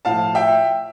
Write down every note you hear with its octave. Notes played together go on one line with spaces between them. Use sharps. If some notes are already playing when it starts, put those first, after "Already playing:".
A2 F3 F5 A5
E5 G5